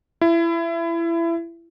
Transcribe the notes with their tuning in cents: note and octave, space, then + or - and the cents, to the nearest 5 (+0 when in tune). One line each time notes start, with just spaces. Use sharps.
E4 +25